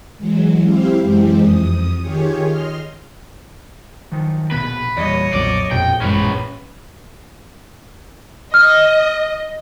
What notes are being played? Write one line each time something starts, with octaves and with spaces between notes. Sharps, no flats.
E3 F#3 G#3
C4 E4 G4 F5
F#2 E3 G#3 C4 G4
F2 D#6
D#3 F4 G4 G#4 C#5
D#5 C6 F6
D#3 F3 F#3
A#1 B2 B3 B4
E2 A#2 G3 C#5 D#5
B1 F2 A#2 F#3 D5
A#1 F2 B2 G5
A1 F#2 G#3 C#4 B4
D#5 F6